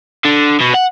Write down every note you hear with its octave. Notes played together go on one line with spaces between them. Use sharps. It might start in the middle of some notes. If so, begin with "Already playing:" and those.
D3
B2
F#5